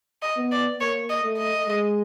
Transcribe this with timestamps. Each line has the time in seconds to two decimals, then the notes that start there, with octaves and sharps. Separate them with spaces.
0.22 D#5
0.37 B3
0.52 D5
0.80 A#3 C#5
1.09 D#5
1.23 A3
1.38 D#5
1.66 G#3